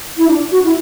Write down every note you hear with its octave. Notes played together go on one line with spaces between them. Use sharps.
E4
D4
F#4
E4